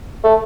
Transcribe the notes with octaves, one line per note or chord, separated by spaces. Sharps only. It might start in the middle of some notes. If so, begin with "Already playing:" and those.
A3